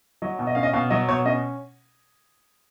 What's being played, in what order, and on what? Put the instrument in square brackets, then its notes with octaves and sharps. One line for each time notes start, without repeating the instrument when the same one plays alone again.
[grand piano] F#3 D#5
B2
D#5
C#4 F5
D#5
B2 F5
F#3 D#5
B2 C#5
C#4 D#5